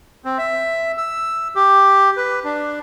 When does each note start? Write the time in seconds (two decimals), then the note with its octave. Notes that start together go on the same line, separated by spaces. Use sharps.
0.25 C4
0.38 E5
0.98 E6
1.55 G4
2.17 B4
2.44 D4